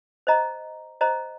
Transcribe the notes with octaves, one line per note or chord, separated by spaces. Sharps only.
C5 D#5 A#5
C5 D#5 A#5